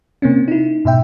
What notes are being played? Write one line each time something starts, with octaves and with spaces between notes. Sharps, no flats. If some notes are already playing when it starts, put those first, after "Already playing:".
C3 A#3 C4 C#4
D#4 E4
G#2 B2 E5 G5